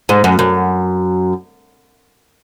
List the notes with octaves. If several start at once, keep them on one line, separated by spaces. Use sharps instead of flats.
G#2
F#2
F#2